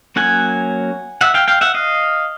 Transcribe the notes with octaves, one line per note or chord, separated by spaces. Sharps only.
F#3 A#3 C#4 F#5 G#5
E5 F#5
F5 G5
F5 G5
E5 F#5
D#5 F5